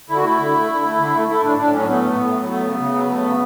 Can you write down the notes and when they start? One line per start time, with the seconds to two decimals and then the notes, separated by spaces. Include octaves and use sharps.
0.09 D3 E4
0.16 F#4
0.23 A3 E4
0.39 D3
0.54 A3
0.69 D3
0.84 A3
0.98 D3
1.14 A3
1.28 A3 E4
1.43 A2 D4
1.58 A2 D4
1.73 F#3 C#4
1.88 A3 B3
2.04 A2
2.19 A2
2.34 F#3
2.49 A3 B3
2.64 C#3
2.79 C#3
2.94 F#3
3.09 A3
3.24 C#3